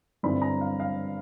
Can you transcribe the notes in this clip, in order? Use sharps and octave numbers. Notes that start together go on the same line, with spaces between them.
G2 D3 G3 C4 E4 B5
A#5
F5
F5